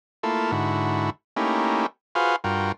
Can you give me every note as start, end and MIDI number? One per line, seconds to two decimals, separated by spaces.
0.23 0.51 57
0.23 0.51 58
0.23 0.51 64
0.23 0.51 65
0.23 0.51 69
0.52 1.10 44
0.52 1.10 50
0.52 1.10 64
0.52 1.10 66
1.36 1.86 57
1.36 1.86 58
1.36 1.86 61
1.36 1.86 63
1.36 1.86 64
1.36 1.86 67
2.15 2.36 65
2.15 2.36 66
2.15 2.36 68
2.15 2.36 71
2.15 2.36 72
2.15 2.36 77
2.44 2.72 43
2.44 2.72 65
2.44 2.72 66
2.44 2.72 70
2.44 2.72 79